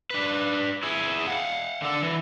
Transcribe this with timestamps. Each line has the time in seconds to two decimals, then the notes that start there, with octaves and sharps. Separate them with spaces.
0.10 D4 B4
0.83 E4 G#4
1.28 F5 F#5
1.82 D3 A4
2.03 E3